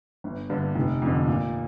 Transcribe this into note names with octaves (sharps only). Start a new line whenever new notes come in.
G1
G2 D3
F1
F2 D3
A#2